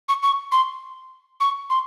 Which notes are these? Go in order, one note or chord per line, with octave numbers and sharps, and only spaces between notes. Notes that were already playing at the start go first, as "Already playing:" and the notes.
C#6
C#6
C6
C#6
C6